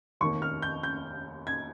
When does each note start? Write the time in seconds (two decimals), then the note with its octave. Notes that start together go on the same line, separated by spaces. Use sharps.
0.21 F1 D#2 D#3 A#3 C#6
0.42 F6
0.62 G6
0.83 G6
1.47 G#6